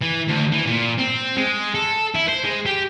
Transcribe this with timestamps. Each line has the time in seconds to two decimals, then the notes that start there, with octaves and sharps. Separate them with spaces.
0.02 E3
0.28 D2
0.52 E3
0.66 A#2
0.99 C4
1.37 G#3
1.75 A4
2.15 E4
2.29 C5
2.44 G#3
2.66 G4